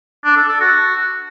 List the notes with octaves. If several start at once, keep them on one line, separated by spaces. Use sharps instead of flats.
D4
A4
A4
F#4